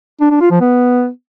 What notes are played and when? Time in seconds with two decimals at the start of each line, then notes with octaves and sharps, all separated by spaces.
0.21 D4
0.31 D4
0.41 F4
0.51 F3
0.61 B3